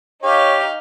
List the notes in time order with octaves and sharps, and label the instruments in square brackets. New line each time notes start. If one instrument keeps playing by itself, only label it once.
[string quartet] D#4 F5 [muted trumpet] G4 [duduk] C#5